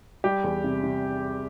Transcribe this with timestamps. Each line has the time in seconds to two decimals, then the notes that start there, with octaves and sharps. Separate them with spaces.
0.24 G3 G4
0.44 E2
0.64 C3
0.83 C3